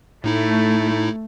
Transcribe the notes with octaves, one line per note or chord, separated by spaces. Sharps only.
A2 A3 D#4 E4